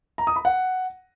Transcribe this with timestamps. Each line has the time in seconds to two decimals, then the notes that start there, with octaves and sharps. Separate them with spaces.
0.18 A#5
0.27 D#6
0.36 B5
0.45 F#5